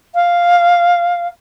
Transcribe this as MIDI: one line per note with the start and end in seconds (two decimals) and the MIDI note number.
0.14 1.27 77